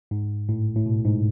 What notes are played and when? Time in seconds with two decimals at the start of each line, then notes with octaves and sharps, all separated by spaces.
0.11 G#2
0.49 A2
0.76 A2
0.86 B2
1.05 G#2